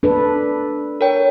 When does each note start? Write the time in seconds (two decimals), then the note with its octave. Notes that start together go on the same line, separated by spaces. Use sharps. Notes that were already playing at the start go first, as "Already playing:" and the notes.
0.03 D4 A4 B4
1.01 A#4 C#5 G5